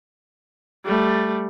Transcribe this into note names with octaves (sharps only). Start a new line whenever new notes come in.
G3 A3